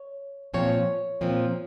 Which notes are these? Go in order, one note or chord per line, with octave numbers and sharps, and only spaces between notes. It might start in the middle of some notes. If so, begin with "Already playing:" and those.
Already playing: C#5
A#2 F3 C4 C#5
A#2 F3 C4